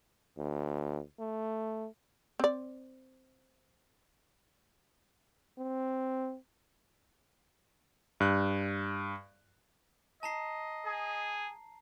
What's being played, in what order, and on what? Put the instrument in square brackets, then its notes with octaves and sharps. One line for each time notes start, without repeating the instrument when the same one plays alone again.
[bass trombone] D2
A3
[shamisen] C4 D5
[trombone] C4
[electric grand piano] G2 F#6
[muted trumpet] D#5 [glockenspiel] A5 A#5 C7
[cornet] G#4